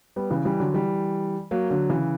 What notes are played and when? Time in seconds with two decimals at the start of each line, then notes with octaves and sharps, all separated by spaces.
0.16 G3 B3
0.30 C#3 E3
0.45 E3 G3
0.60 D3 F#3
0.74 E3 G3
1.51 F#3 A#3
1.70 D3 F#3
1.89 C#3 E3